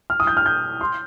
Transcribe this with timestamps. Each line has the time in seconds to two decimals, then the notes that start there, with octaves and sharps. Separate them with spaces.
0.10 F6
0.20 D#6
0.27 G6
0.37 F6
0.46 G6
0.81 C6